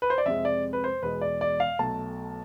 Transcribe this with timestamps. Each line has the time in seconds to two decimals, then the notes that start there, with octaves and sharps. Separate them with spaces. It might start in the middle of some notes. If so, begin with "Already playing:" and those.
0.02 B4
0.10 C5
0.18 D5
0.26 F2 C3 G#3 E5
0.45 D5
0.73 B4
0.84 C5
1.02 E2 B2 G#3 B4
1.21 D5
1.41 D5
1.60 F5
1.79 B1 B2 A3 A5